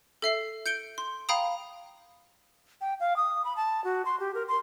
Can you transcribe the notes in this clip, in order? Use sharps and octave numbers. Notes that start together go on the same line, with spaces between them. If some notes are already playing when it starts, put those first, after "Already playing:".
A4 E5 C7
G6 C#7 D7 G7
C6
F5 G5 A#5 B5 D#6
G5
F5
D#6
B5
A5
F#4
C6
G4
A#4
C6